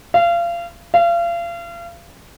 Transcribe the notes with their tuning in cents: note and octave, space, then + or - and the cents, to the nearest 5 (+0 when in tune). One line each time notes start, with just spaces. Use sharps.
F5 -30
F5 -35